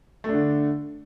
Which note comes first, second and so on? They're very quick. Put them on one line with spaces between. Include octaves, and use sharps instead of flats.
A3 D4 D3